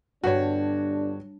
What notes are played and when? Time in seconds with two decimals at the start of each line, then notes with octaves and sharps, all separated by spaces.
0.24 G1 G2 D4 F#4 C#5